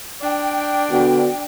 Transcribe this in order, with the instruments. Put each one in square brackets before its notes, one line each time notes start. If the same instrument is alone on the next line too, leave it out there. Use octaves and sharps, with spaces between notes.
[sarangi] D4 [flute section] G5
[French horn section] D3 B3 F#4